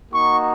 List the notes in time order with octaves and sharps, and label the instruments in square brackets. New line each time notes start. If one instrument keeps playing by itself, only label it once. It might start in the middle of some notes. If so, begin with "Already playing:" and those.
[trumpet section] A#3 D#4 F#4 C#6